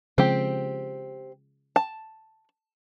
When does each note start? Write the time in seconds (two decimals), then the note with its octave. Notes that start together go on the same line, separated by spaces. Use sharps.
0.18 C#3 F3 G#3 C4 G4
1.76 A5